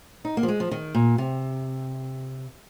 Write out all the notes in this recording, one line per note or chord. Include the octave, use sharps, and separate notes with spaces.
D#4
A#3
F3
G#3
F3
D#3
A#2
C3